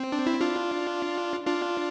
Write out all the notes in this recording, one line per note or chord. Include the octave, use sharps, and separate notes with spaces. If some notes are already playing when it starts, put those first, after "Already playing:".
Already playing: C4
D4
E4
D4 F4
D4 F4